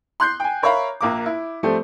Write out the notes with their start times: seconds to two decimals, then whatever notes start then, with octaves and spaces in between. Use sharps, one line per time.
0.20 C6 F#6 G6 C7
0.40 G5 G#5
0.63 A#4 C#5 E5 F5 A#5 B5
1.01 A#1 A#3 D6
1.26 E4
1.63 F3 G3 A3 C4 A4